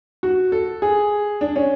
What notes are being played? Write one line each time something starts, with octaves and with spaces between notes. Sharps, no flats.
F#4
A4
G#4
D4
C#4